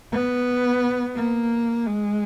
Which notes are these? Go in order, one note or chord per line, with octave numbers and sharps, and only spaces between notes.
B3
A#3
G#3